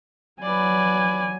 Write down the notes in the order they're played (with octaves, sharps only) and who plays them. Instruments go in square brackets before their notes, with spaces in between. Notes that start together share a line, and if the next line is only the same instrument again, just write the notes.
[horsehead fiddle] F#3 G#5 [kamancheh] B4 D5